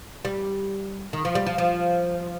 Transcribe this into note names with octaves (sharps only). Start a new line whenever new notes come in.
G3
D#3
F3
G3
F3
F3